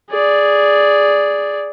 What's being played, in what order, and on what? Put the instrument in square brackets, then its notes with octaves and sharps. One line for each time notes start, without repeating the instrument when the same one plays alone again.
[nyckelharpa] G#4 D5